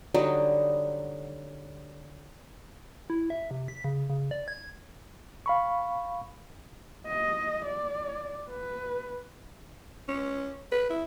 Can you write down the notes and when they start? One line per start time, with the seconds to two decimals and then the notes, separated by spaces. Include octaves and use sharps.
0.14 D3 F#3 G3 D#4
3.10 E4
3.30 E5
3.51 C3
3.68 B6
3.84 C#3
4.10 C#3
4.31 D5
4.48 G#6
5.46 F5 B5 C#6
7.07 D#5
7.65 D5
8.50 B4
10.08 C#4
10.72 B4
10.90 E4